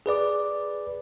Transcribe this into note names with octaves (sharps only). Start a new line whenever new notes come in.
G#4 B4 D5 D6